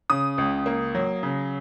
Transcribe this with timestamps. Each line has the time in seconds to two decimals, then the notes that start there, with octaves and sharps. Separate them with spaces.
0.10 C#3 D#6
0.38 C#2
0.66 A#3
0.95 F#3
1.23 C#3